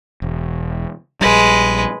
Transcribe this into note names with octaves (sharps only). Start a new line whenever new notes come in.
E1
A#1 G3 G#3 B4